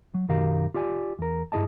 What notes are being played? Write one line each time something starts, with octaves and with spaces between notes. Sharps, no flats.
F#3
B1 F#2 D#3 G4 A#4 F5
F4 G4 D5 G#5
E2 A#4
G2 E4 G#4 D#5 A5